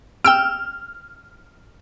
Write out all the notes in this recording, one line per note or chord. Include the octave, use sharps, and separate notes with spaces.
G5 E6 F6 D7